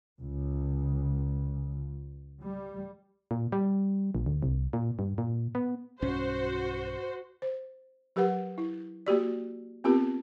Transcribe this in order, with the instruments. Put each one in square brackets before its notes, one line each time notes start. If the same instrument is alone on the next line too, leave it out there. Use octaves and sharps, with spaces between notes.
[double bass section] C#2
G3
[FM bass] A#2
G3
A#1
D2
C2
A#2
G2
A#2
B3
[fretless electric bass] B1 G2 C#4 [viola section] F#4 C5
[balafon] C5
F#3 G4 A#4 B4 F#5
E4
A#3 F#4 G4 D5
B3 C4 F4 G4 A#4